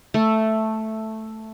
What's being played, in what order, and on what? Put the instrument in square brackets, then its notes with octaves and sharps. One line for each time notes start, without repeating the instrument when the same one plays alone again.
[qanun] A3